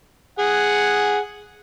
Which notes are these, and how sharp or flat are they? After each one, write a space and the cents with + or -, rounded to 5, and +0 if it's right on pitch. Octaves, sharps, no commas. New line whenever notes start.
G#4 +0 F#5 +0